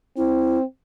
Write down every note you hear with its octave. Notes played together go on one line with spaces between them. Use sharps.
C4 E4